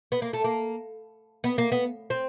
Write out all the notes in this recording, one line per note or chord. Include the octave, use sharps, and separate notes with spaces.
B3
A#3
A3
A#3
B3
A#3
B3
C4